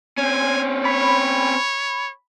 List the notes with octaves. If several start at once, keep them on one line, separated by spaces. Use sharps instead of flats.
C4 C#4 G#5
C#5 B5